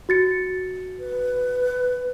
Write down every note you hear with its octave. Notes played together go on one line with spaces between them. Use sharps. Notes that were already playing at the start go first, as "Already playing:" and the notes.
F#4 A6 C#7
B4